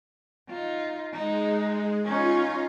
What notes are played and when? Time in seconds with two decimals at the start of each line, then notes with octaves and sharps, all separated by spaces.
0.49 D#4 F4
1.14 G#3 D#4
2.05 C#4 D#4 F4